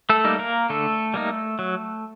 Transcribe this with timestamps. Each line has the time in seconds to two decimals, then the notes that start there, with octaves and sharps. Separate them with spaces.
0.10 A3 A4
0.24 G3 A#3 D#4
0.39 A#3 A#4
0.69 D3 A3 A4
1.14 G3 A#3 D#4
1.59 F#3